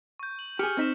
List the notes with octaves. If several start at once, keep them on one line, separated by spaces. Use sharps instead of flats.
C#6 G6
F#7
G4 G#4 F6 C#7
C4 D#4 G6 B6 E7